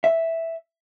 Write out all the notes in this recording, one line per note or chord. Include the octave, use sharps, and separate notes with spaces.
E5